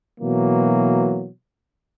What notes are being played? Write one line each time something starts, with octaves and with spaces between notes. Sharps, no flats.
B2 E3 F#3 A#3